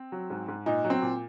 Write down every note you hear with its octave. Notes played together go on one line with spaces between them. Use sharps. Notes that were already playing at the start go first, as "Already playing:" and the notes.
Already playing: C4
F#3
G#2
G#2
A#2 D#4
F#3
C4
A#2